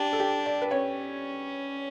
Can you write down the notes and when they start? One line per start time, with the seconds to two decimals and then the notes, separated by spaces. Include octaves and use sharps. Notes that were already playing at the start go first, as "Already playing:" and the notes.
Already playing: D4 G4
0.13 A4
0.20 G4
0.46 D5
0.62 B4
0.71 C#4 C#5